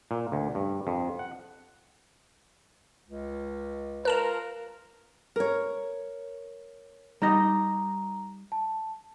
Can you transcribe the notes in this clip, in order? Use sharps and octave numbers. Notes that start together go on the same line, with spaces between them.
A#2
D2
G2
F2
F#5
C#2
F4 A#4 B4 A5 A#5
A#4 C#5
G3 D#4 D#5 A#5
A5